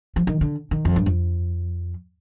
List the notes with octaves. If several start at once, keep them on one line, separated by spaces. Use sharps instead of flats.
F3
D#3
D3
D#3
F2
G2
F2